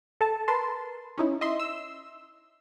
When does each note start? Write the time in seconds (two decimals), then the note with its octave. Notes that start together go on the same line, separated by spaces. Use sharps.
0.21 A4 A5
0.48 A#4 B4 A5 C6
1.18 C#4 D#4 E4
1.41 D#5 E5 C6
1.60 E6